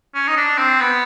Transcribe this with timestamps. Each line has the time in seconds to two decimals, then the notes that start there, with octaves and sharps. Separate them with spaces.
0.15 C#4
0.28 D#4
0.37 D4
0.58 C4
0.81 B3